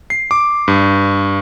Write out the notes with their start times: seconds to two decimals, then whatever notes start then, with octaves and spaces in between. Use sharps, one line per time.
0.10 C7
0.31 D6
0.68 G2